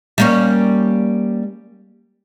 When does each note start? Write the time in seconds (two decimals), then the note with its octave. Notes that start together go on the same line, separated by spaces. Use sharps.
0.18 G3 A#3 C#4